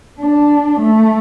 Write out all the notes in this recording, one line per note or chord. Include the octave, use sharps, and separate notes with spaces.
D4
A3